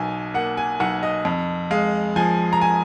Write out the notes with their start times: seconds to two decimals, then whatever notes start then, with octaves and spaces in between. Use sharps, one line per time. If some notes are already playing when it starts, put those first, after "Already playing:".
Already playing: B1 B2 G#5
0.34 A#3 F#5
0.57 G#5
0.80 B1 F#5
1.03 D#5
1.25 F2
1.71 G#3 F5
2.16 F3 G#5
2.53 A#5
2.61 G#5